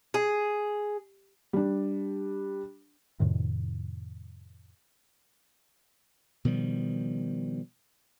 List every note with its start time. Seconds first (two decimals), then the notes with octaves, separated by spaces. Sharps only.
0.14 G#4
1.53 G3 D4
3.20 F2 A2 C3 D#3
6.45 B2 D#3 F3 G3